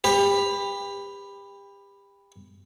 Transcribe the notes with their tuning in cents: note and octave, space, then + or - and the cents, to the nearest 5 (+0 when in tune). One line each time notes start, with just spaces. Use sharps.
G4 +30 B4 +0